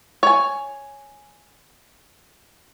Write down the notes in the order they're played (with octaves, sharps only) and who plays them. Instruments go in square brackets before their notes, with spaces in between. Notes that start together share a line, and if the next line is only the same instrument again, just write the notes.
[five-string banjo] C#5 G#5